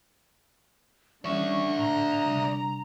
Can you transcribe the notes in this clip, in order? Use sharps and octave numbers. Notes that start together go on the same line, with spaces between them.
D3 E3 G3 C#4 D5 E5 C#6
A2 A#5
C3 G3